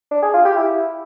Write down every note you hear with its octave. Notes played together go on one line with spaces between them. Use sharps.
D4
G#4
F4
G4
E4